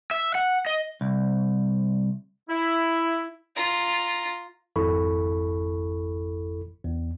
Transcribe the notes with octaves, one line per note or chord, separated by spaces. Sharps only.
E5
F#5
D#5
C2
E4
F4 A#5
G#1 F2 E4 A4 B5 C#6
E2